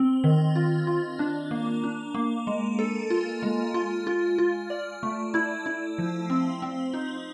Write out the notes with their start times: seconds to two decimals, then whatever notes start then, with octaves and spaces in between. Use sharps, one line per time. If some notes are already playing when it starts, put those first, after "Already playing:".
Already playing: C4
0.24 D#3
0.56 F4
0.87 F4
1.19 D4
1.51 A#3
1.84 D4
2.15 A#3
2.47 G#3
2.79 A4
3.10 F4
3.43 G#3
3.74 F4
4.07 F4
4.38 F4
4.70 D5
5.03 A3
5.34 E4
5.66 E4
5.98 F3
6.30 C4
6.62 C4
6.94 D#4